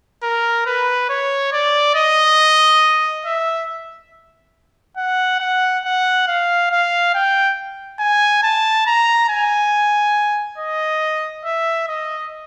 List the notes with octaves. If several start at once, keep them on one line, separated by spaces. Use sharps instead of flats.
A#4
B4
C#5
D5
D#5
E5
F#5
F#5
F#5
F5
F5
G5
G#5
A5
A#5
G#5
D#5
E5
D#5